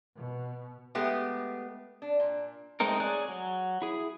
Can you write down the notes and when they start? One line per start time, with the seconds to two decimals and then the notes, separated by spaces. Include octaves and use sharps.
0.16 B2
0.95 G#3 A3 B3 G4
2.02 D4
2.20 A#2
2.80 G#3 A3 C4 D#4 A#4
3.00 G#4 C#5 D5 G#5 F#6
3.29 F#3
3.82 E4 G#4